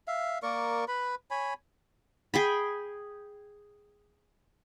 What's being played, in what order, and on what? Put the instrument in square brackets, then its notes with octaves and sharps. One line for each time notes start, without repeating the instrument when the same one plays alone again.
[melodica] E5 F5
A#3 A#4 D5 C#6
B4 B5
C#5 G#5 B5
[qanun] G#4 G5 B5